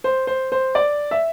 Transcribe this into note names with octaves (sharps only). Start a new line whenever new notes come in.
C5
C5
C5
D5
E5